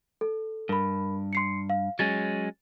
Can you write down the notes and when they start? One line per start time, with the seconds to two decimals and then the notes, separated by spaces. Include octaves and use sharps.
0.21 A4
0.69 G2 A#4 B5
1.33 C6 C7 C#7
1.70 F5
1.99 F#3 G#3 C#4 A6